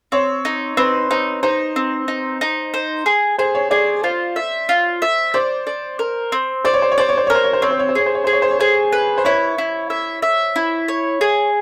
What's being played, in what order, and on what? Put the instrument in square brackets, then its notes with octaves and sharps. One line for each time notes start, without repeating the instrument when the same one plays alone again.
[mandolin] C4 [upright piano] C#5
[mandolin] D#4
[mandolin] C4 [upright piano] B4
[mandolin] D#4 [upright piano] C5
[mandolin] D#4 [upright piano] C5
[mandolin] C4
D#4
D#4
C5
G#4
[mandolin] G#4 [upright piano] C5
[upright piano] C#5
[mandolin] G#4 [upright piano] D5
[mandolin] F4 [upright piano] C5
[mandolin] E5
F4
E5
[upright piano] C5 [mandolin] D5
[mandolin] D5
A#4
C4
[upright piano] C5 [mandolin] D5
[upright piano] C#5
C5
C#5
[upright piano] C5 [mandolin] D5
[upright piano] C#5
C5
[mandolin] A#4 [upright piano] C#5
[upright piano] C5
C#5
C5
[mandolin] C4 [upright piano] C#5
[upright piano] C5
C#5
C5
[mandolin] G#4 [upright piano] C#5
[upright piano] C5
C#5
[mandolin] G#4 [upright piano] C5
[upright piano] C#5
C5
C#5
[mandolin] G#4 [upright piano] C5
[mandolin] B4
[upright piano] C5
[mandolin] E4 [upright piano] C#5
[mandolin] E4
E5
E5
E4
C#5
G#4